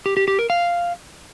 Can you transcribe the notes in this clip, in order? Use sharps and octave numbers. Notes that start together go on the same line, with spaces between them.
G4
G4
G4
A#4
F5